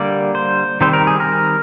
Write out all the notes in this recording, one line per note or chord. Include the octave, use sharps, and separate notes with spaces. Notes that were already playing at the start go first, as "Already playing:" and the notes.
Already playing: D3 G3 A#3 D5
C5
D#3 G3 C4 C5
A#4
G#4
A#4